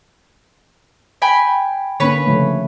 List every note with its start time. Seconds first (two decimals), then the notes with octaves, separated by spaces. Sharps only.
1.22 G5 G#5 B5
2.00 D3 A#3 C#4 B4 C#5
2.26 C#3 F3 A3